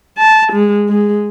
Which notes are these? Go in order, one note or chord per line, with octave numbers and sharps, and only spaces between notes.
A5
G#3
G#3